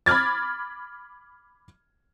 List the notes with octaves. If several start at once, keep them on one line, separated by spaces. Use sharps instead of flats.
B5 D6 F6 G#6 A6